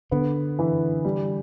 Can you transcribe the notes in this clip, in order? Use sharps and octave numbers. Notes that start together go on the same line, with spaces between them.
D3 B3
E3
G3